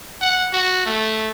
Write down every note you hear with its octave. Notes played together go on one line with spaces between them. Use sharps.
F#5
F#4
A3